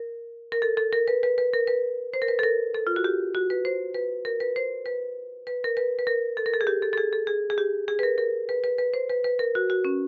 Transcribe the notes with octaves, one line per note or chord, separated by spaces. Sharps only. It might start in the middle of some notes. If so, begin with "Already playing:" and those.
Already playing: A#4
A#4
A4
A4
A#4
B4
B4
B4
A#4
B4
C5
A#4
B4
A4
A#4
A4
F4
F#4
G4
F#4
B4
C5
B4
A#4
B4
C5
B4
B4
A#4
B4
B4
A#4
A4
A#4
A4
G#4
G4
A4
A4
G#4
A4
G#4
G#4
G4
G#4
B4
A#4
A#4
B4
B4
B4
C5
B4
B4
A#4
F#4
F#4
C#4